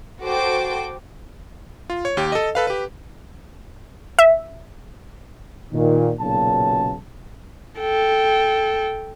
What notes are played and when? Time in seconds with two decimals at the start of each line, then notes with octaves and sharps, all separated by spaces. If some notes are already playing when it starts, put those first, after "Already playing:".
0.22 F#4 A4 C5 G5 D6
1.90 F4
2.05 C#5
2.17 D#2 G4
2.32 A4 D#5
2.55 A4 B4 F5
2.67 G4 B4
4.19 E5
5.73 A#2 D#3
6.20 B1 A#2 C#3 A5
7.80 A4 G5